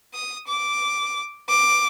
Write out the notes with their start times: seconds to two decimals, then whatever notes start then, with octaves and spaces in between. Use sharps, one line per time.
0.14 D#6
0.48 D6
1.49 D6